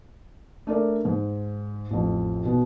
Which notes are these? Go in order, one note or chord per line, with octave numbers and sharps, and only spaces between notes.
A3 D4 A#4 D5
G#2
A1 F2
B2